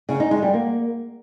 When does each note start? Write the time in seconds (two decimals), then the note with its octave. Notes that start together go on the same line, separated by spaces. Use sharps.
0.09 C#3
0.20 D#4
0.31 G#3
0.42 G3
0.54 A#3